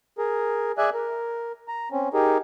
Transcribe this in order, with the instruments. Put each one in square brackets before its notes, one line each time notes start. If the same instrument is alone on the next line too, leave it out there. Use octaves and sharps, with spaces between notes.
[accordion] G#4 A#4
G#4 D5 E5 G#5 F#6
A#4
A#5
C4 C#4
D#4 G4 G#4 A#4